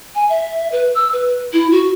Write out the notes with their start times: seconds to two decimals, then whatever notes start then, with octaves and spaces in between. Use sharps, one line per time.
0.15 G#5
0.29 E5
0.72 B4
0.95 E6
1.13 B4
1.53 E4
1.71 F#4